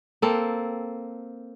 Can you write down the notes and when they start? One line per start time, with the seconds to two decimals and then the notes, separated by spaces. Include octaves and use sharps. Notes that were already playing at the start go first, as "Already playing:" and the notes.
0.22 A#3 C4 A4